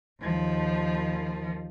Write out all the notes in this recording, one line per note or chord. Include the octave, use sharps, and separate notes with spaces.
D#2 F3